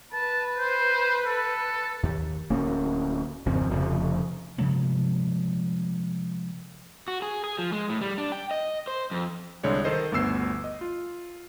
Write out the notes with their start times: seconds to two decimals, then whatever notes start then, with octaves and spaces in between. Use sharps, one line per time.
0.14 B4 A5
0.58 C5
1.26 A4
2.03 D#2
2.50 D1 A#3 C#4
3.46 G#1 F2 C#3 C4
3.70 F1 F2 C#3 F3
4.58 C3 F3 G#3 A#3
7.08 F#4
7.22 G#4
7.44 G#4
7.59 F3
7.72 G#3
7.89 A2
8.01 G3
8.18 D4
8.32 G5
8.51 D#5
8.87 C5
9.11 F2
9.63 C2 D3 G#3 C#5 D5
9.84 D#3 A4 C5 D#5
10.12 G1 D2 B3 E6 C7
10.64 D#5
10.81 F4